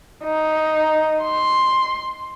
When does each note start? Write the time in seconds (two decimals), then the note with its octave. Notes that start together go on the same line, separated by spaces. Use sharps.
0.24 D#4
1.23 C6